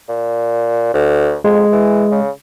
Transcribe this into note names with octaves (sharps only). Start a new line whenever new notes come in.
A#2
D2
F2 G#3
E3
C#3